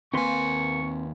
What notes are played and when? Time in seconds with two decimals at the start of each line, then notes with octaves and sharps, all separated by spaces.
0.13 D#2 A#3 C4 B4 G#5 C6 C#6